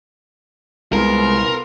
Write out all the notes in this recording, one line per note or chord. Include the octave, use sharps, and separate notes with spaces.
C2 C3 G#3 B3 F4 A#4